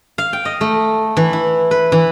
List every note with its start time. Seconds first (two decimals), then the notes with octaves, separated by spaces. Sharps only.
0.18 F5
0.33 G5
0.45 D#5
0.61 A3
1.17 E3
1.33 E4
1.71 B4
1.92 E3